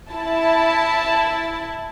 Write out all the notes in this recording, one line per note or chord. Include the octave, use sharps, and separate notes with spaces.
E4 A5